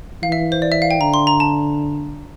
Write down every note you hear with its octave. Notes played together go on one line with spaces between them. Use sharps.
E3 F5
E5
C5
D5
E5
F5
G5
D3 A#5
C6
A#5
A5